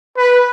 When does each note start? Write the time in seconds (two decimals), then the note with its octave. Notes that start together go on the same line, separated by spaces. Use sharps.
0.17 B4